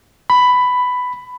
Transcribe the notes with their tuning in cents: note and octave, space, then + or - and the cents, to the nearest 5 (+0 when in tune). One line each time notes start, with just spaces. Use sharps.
B5 +10